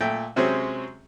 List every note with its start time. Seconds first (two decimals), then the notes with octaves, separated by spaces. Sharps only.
0.01 A#2 A3 G5
0.36 C3 F#3 G#3 C4 C#4 G#4